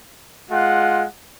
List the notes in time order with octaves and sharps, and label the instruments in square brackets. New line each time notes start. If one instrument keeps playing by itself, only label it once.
[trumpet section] G#3 F4 F#5